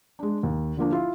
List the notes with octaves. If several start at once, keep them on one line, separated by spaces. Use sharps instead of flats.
G#3 D4
D#2
D3 F3 A#3 D4
E4 F4